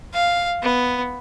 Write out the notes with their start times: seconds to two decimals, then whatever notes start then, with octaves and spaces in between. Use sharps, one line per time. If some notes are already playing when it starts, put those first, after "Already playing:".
0.13 F5
0.62 B3